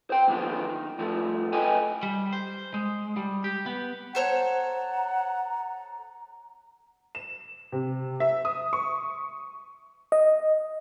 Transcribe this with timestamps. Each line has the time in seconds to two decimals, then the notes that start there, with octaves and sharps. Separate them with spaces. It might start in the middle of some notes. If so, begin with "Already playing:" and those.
0.10 C5 G5
0.27 F#2 A#2 D3 D#3 F3 B3
0.69 D#3
0.98 G2 F3 A3
1.53 G4 A4 B4 D#5 G5 G#5
2.03 G3
2.33 C5
2.74 G#3
3.17 G3
3.44 G4
3.66 B3
4.15 A4 C5 C#5 F#5 A#5
7.15 E7
7.72 C3
8.20 E5
8.45 D#6
8.73 C#6
10.12 D#5